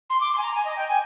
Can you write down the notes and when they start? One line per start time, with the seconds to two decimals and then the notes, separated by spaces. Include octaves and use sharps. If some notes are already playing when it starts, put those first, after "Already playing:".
0.10 C6
0.20 D6
0.32 C6
0.38 G#5
0.43 A#5
0.54 G#5
0.65 D#5
0.76 G5
0.88 G#5